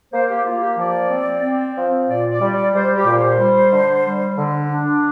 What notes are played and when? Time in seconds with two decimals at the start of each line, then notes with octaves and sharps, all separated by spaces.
0.12 A#3 C5
0.29 G4
0.45 A#3 F4
0.61 G4
0.77 F3 D5
1.10 C4
1.43 C4
1.76 F3
2.09 A#2 D5
2.31 D5
2.41 G3
2.52 D5
2.73 G3 C5
2.96 G4
3.06 A#2
3.18 C5
3.39 G3
3.72 D3
4.04 G3
4.38 D3
4.69 D4